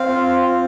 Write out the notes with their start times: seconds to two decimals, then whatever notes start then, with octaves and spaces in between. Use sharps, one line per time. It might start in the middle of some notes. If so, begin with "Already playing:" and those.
Already playing: C4 F5
0.09 F4
0.42 C4